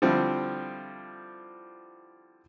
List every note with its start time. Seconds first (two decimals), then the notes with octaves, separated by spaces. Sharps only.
0.02 D3 F3 G3 C4 E4